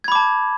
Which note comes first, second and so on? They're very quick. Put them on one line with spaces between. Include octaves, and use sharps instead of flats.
G#6 B5 D6 A5